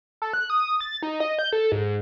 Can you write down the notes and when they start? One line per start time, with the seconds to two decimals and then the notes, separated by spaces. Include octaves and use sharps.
0.22 A4
0.33 F#6
0.50 D#6
0.81 A6
1.03 D#4
1.20 D#5
1.39 G6
1.53 A4
1.72 G#2